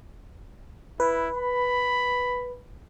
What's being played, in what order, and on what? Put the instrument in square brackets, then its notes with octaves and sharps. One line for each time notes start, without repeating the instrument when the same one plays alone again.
[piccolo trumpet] E4 [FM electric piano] B4
[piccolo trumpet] B5